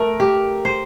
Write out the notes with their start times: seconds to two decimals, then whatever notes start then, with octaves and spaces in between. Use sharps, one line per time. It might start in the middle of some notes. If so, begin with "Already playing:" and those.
Already playing: A3 A#4
0.20 G4
0.65 C5